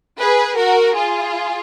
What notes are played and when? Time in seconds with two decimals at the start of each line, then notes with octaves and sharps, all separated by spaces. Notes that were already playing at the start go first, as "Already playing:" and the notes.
0.19 G#4 B4
0.57 F#4 A#4
0.95 F4 G#4